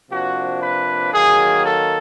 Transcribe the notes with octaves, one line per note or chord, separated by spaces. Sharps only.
C3 F3 A#3 D4 F#4
B4
D#3 F#3 A#3 G#4
A4